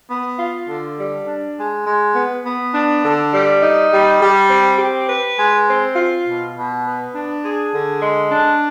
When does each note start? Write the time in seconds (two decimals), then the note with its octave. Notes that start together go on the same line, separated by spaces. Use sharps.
0.09 B3
0.38 F4
0.68 D3
0.97 G3
1.27 D4
1.56 G#3
1.85 G#3
2.14 B3
2.44 B3
2.73 D4
3.03 D3
3.32 G3
3.61 D#4
3.91 G3
4.20 G3
4.49 C4
4.78 G4
5.08 B4
5.37 G#3
5.66 C4
5.96 F4
6.25 B2
6.54 B2
6.84 B3
7.13 D4
7.42 G#4
7.72 D3
8.01 G#3
8.30 D4